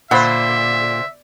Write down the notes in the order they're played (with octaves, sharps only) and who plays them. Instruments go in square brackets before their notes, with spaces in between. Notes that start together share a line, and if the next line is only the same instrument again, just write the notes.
[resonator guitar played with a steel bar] A#2 [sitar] D3 C5 [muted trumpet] E5 [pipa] F#5 B5